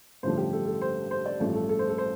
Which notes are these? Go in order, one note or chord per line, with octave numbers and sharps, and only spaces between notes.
A1 G2 D3 F3 A3 C5
G4
A4
A4
C5
C5
D5
A1 G2 F3 A3
A4
A4
C5
A4
C5